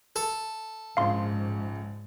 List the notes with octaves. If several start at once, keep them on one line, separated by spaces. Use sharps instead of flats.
A4
A#1 G#2 C#3 F3 F5 C6